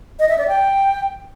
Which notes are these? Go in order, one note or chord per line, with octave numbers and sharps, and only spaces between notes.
D#5
E5
D5
G5